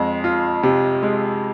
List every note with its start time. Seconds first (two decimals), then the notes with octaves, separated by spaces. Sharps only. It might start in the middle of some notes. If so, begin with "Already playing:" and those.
Already playing: F2 G#3
0.24 F4
0.63 C3
1.03 G#3